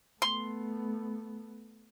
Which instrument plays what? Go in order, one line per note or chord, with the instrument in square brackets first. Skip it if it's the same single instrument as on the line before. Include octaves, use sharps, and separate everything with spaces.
[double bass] A3 B3 [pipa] C6